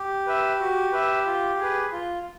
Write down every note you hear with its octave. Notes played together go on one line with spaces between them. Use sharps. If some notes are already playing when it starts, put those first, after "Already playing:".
Already playing: G4
B4 E5
F#4
B4 E5
F4
G#4 B4
F4